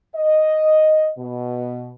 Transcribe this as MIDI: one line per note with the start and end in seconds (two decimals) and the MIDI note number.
0.15 1.10 75
1.18 1.92 47